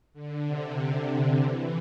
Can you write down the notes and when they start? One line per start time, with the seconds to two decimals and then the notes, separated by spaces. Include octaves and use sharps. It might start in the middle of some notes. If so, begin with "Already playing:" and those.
0.13 D3
0.45 C3
1.40 E3